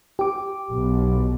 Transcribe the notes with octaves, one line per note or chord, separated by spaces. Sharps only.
G4 D6
B1